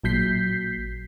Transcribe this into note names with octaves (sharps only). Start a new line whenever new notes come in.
A1 A#2 F#3 G6 B6 C7